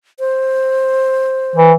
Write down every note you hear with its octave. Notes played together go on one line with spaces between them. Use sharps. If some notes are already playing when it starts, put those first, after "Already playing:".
C5
E3